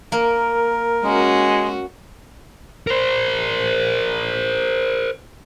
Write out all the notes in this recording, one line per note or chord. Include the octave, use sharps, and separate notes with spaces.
A#3 A#4
G#3 C#4 F#4
A#4 C5